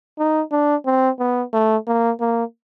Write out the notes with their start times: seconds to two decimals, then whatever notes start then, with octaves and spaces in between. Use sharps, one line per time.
0.18 D#4
0.52 D4
0.86 C4
1.19 B3
1.53 A3
1.87 A#3
2.20 A#3